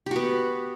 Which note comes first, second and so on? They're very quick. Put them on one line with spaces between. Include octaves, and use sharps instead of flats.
G4 F#4 B3